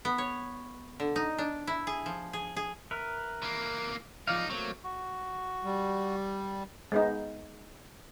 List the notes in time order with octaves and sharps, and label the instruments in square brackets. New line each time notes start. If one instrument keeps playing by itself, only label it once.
[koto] B3
C#5
D3
D#4
D4
E4
G#4
F3
G#4
G#4
[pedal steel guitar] A#4 B4 E5
[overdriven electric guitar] E3 A#3
[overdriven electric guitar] C#2 D#4 [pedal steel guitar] F3 D5 F5
[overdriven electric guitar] F#3 [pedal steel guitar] A3 A#3 C4
[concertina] F#4
[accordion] G3
[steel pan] G#3 B3 D#4